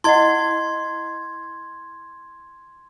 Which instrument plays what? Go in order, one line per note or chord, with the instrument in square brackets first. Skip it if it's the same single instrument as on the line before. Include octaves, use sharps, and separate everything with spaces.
[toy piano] E4 D#5 F#5 [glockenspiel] C6 G#6